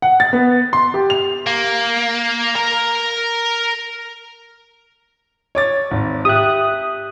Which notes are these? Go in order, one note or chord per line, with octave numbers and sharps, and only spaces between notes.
F#5
A6
B3
C6
G4
F7
A#3
A#4 A#5
C#5 D6 A6
G#1
G4 E5 D#6 F#6